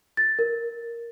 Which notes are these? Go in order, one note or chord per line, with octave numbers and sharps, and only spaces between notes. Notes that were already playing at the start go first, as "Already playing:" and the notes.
A6
A#4